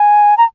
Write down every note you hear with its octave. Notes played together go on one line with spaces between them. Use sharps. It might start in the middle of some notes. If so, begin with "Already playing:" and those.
Already playing: G#5
A#5